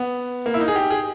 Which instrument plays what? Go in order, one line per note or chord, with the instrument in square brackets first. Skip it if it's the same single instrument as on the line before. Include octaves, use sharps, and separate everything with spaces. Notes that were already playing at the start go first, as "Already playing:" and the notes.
Already playing: [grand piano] B3
A#3
E4
D#4
G#4
G4
G#4